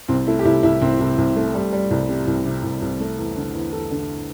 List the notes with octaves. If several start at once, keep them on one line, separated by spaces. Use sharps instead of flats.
C2 C4
A3 E4
G4
C2 E4
C2 E4
C2 C4
C2
C2
A3
G3
G3
C2
C3
C2
C3
C2
C2
A3
E2
D3
E2
E2 A4
D3